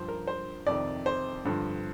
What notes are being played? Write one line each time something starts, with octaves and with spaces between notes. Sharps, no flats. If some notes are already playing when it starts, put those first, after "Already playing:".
Already playing: G2 F3 C5
A#4
C5
F2 C3 D#3 D5
C5
G2 D3 F3